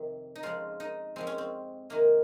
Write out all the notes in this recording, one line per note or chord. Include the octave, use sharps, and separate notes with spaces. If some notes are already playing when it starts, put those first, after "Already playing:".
Already playing: F2 C3 D#3
D#4
F2 C#3 F3 G#3 F4
D#4
F2 C#3 F3 G#3 C4
C#4
C4
C3 D#3 G#3 A#3